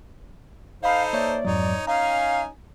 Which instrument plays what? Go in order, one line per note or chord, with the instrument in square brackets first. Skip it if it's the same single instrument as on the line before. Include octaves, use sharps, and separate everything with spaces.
[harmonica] D#4 A4 C5 [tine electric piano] D#5 B5 [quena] F5
[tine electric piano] A#3 C#5 E5 [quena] D5
[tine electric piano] F2 G#2 F#3 [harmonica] D#4 C#5
[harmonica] C#4 D#4 G#5 [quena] F5 [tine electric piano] A#5